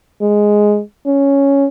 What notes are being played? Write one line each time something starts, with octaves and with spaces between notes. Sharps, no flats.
G#3
C#4